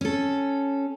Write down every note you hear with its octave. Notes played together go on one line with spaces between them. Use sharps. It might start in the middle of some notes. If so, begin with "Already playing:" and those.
C#4 A4